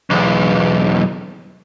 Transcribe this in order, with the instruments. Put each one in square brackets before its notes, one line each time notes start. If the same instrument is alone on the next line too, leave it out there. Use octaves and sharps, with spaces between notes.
[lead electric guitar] B1 E2